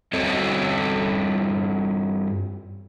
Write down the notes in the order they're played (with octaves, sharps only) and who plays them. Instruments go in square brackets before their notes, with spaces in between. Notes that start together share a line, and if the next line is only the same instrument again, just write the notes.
[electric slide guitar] G2 C4 A4 C#5 D#5